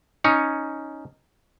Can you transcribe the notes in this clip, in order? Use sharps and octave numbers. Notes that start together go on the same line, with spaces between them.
C#4 D#4 C#5